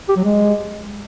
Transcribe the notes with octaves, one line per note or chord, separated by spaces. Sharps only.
G4
F#3
G#3